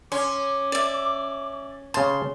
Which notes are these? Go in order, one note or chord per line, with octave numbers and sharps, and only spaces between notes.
C#4 C6 D6
D5 E5
C#3 A5 C6